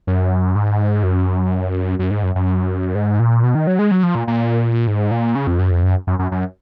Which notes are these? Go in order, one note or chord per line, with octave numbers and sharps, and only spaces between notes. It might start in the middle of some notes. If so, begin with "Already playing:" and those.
F#2
G#2
F#2
F#2
G#2
F#2
F#2
G#2
A#2
B2
D#3
F#3
G#3
F#3
F3
A#2
A#2
G#2
A#2
C#3
F2
F#2
F2
F#2
F#2
F#2
F#2